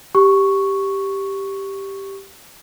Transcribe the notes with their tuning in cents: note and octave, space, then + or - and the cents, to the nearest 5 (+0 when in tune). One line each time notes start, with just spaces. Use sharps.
G4 +0 C#6 +0